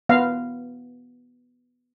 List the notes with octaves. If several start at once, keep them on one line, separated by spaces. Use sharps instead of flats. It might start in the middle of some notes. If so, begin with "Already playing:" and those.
B3 F5